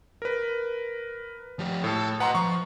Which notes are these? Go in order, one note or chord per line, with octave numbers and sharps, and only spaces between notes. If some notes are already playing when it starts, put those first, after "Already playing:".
A#4 B4
F3 G4
A2 A4 A5
B4 D#5 F#5 A#5 C6
F3 C#6